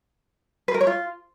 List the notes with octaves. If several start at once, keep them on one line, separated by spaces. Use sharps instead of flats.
B4
A#4
C#5
F4